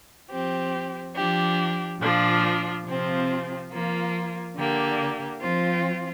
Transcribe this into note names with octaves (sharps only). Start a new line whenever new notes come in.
F3 C4 G4
F3 D4 G4
A#2 F3 D4 F4
C3 F3 C4 F4
F3 A#3 F4
D3 A#3 G4
F3 C4 F4